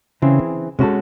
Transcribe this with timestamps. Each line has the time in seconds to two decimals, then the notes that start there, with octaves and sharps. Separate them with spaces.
0.22 C#3 E3 C4 E4 G#4
0.79 C3 G#3 C#4 F#4 A4